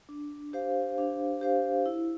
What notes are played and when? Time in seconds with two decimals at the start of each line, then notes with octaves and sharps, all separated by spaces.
0.09 D4
0.53 G4 C5 F5
0.98 D4
1.41 G4 C5 F5
1.86 E4